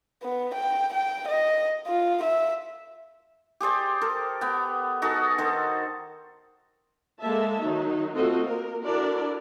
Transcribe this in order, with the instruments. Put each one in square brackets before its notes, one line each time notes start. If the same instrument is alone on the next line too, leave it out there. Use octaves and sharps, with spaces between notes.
[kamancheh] B3
G5
G5
D#5
F4
E5
[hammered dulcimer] G4 G#4 C5 D5
A4 A#4
B3 G5
D#4 F#4 G#4 A4
D#3 A4 C5
[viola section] G#3 A#3 A4 E5 A5
D#3 F#3 D#4
A3 C4 F4 F#4 A4 D#5
A#3 A#4
D4 E4 F#4 A4 A#4 D5